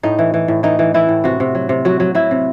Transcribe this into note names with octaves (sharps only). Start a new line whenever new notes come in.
A2 D#4
E3
E3
A2
E3 D#4
E3
E3 E4
A2
C3 F#4
C3
F#3
C3
F#3 F#4
F#3
F#3 E4
C3